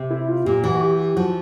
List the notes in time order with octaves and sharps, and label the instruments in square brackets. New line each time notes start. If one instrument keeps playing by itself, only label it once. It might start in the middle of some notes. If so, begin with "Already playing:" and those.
Already playing: [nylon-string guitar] C3
[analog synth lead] E4
F4
[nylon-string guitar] A#2 [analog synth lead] G4
[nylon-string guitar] E3 [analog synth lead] F#4
[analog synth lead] F#4
G4
[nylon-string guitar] F3 [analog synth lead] F#4